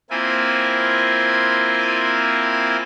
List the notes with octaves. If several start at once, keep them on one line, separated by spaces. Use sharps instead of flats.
A#3 C4 E4 F4 G#5